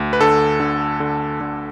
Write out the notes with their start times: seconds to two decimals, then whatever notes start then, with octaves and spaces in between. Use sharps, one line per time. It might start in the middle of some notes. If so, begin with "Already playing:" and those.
Already playing: D2
0.13 B4
0.21 D3 A4
0.60 D3
1.00 D3
1.41 D3